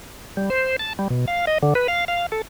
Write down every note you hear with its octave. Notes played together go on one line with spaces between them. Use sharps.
G3
C5
A5
G3
B2
F5
D#5
D3
B4
F5
F5
A4